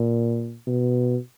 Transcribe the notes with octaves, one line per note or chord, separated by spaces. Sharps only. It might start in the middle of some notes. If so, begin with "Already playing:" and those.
Already playing: A#2
B2